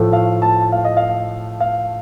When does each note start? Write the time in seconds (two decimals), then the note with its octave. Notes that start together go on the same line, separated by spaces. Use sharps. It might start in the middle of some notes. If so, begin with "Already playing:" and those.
Already playing: A2 F3 A3
0.13 F5
0.42 A5
0.72 F5
0.84 D#5
0.97 F5
1.60 F5